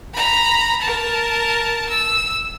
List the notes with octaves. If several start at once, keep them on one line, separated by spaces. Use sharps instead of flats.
A#5 B5
A#4 A5
E6